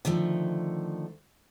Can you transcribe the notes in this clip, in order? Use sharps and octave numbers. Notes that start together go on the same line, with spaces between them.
D3 D#3 F3 A3